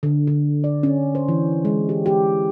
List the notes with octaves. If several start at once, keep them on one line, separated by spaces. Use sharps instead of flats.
D3
D3
D5
C#4
C5
E3
G#3
G4
G4